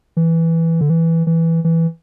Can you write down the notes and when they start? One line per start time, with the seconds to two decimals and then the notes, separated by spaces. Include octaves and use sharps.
0.17 E3
0.81 D3
0.90 E3
1.27 E3
1.64 E3